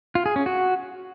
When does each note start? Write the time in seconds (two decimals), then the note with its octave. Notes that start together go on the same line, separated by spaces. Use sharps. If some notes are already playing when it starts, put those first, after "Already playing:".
0.15 F4
0.26 G#4
0.36 C#4
0.46 F#4